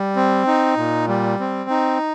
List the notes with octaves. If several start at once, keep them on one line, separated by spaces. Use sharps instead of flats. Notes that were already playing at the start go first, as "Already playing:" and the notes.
Already playing: G3
C4
D#4
A#2
G3
C4
D#4